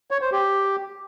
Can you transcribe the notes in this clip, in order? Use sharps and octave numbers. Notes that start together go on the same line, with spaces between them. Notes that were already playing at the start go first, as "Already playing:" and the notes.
C#5
C5
G4